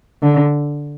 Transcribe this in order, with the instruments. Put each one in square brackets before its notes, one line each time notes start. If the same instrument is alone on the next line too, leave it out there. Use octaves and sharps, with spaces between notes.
[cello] D3